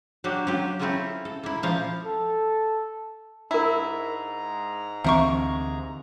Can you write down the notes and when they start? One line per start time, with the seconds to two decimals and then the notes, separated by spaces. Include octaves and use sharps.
0.24 F#3 A#3 D4 F#4 G4
0.47 F#3 C#4 F4 G4
0.79 C4 C#4 E4 F4 A4 A#4
1.25 A4
1.43 A#3 E4
1.63 A#2 F3 F5
2.06 A4
3.51 G#2 G#3 D4 E4 A#4 A#5
5.04 D2 C3 E3 A#3 C4 C#6